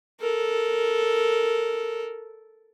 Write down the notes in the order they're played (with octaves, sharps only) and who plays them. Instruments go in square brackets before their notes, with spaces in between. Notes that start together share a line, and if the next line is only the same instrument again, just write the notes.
[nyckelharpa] A4 A#4